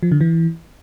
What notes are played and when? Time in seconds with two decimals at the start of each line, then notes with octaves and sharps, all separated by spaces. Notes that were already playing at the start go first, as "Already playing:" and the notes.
0.03 F3
0.12 D3
0.21 E3